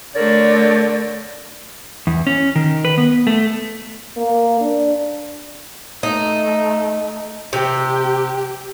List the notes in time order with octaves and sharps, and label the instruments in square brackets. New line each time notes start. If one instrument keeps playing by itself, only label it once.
[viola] D3 A3 [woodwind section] A#4 C#5 D5
[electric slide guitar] E2
C#4
D#3
B4
B3
A3
[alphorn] A#3
D4
[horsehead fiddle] A3 [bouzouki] D#4
[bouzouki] C3 [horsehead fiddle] G4